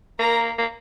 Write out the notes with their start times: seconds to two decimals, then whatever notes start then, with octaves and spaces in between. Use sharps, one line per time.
0.19 A#3 A#4 A#5
0.59 A#3